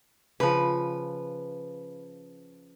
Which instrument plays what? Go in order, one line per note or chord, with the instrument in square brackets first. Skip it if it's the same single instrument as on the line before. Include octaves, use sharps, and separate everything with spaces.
[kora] C#3 F3 [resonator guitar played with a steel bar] B4